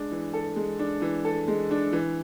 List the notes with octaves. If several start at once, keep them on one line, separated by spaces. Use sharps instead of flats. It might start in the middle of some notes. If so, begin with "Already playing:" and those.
Already playing: G#3 D4
E3
A4
G#3
D4
E3
A4
G#3
D4
E3